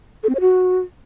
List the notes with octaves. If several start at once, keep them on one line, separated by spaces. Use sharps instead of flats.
A4
C4
C#5
F#4